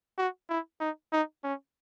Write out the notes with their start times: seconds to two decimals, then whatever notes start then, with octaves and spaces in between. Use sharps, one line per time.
0.18 F#4
0.49 E4
0.80 D#4
1.13 D#4
1.44 C#4